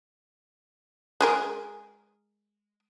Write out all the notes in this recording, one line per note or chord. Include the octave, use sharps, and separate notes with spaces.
G#3 G#4 A#4